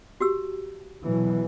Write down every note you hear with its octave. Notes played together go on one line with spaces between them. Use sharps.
F#4 G4 E6
B2 E3 F#3